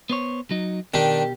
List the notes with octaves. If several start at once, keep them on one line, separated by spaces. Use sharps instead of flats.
B3 C5 C#5
F#3 D#4
B2 D#3 D4 G4